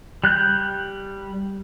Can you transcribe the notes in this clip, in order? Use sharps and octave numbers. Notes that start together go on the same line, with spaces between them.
G3 F#6 G6